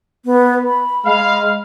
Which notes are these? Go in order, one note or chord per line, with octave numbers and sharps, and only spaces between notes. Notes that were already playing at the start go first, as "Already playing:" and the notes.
B3
B5
G#3 F5